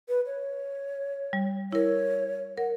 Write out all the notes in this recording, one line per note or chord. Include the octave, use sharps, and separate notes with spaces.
B4
C#5
G3
E4 A#4 C#5
A#4 F#5